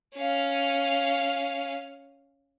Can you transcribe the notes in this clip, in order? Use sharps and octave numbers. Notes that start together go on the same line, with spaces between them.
C#4 F5